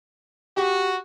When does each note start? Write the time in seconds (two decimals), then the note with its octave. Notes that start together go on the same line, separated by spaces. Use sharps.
0.57 F#4 G4